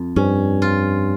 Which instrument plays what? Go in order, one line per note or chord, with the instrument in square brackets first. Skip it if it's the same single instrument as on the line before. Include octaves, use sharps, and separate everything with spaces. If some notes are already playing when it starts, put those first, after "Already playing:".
Already playing: [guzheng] F2
[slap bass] G2 [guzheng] C#4
[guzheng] F4